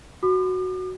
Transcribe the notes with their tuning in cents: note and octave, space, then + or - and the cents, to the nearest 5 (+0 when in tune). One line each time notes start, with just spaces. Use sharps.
F#4 +0 D6 +45